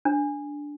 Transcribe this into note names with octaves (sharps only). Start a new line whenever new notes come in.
D4